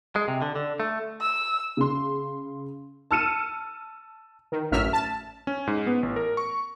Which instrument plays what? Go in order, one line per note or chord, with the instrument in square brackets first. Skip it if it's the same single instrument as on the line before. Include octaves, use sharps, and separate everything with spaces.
[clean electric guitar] G#3
C3
D3
D3
A3
[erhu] E6
[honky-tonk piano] C#3 C6
A5 E6 F6 C#7 D#7 E7
[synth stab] D#3
A1 F#2 E5 F6 B6
A5
[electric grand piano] C#4
G#2
B3
A1
A#4
C#6